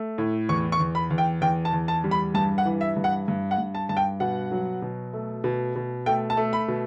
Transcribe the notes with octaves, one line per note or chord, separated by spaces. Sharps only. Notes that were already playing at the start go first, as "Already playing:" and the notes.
Already playing: A3
A2
E2 C#6
C#6
E2
B5
E2
G5
E2 G5
A5
E2
A5
G3
B5
G2 A5
F#5
E3
E5
G2
F#5
G2
F#5
G2
A5
G2 A5
G5
B2 F#5
F#3
B2
A3
B2
B2
A3 G5
A5
A3
B5
B2